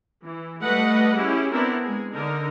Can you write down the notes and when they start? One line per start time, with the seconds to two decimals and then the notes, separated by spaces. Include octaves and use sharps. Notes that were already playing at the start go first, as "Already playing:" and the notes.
0.24 E3
0.62 G3 A3 B4 D#5 F#5
1.15 C#4 E4 G4 G#4
1.51 B3 C4 D4 E4 A#4
1.84 G#3 G#4
2.13 D3 D#4 A#4